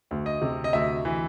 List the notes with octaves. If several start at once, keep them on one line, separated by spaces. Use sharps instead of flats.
D2
D#5
C3
D#5
D2 E5
E3